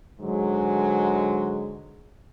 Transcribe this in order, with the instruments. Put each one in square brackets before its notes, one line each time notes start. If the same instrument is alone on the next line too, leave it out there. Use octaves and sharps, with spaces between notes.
[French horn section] G#2 D3 F#3 G#3